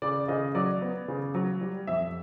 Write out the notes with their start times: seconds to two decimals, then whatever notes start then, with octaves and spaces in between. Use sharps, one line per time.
0.02 C#3 D5
0.28 C#3 D#5
0.55 F#3 D5
0.82 B3
1.08 C#3
1.34 F#3
1.61 G3
1.87 F2 E5